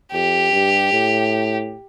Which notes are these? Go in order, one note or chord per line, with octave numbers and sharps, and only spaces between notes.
F2 G4
G2
A2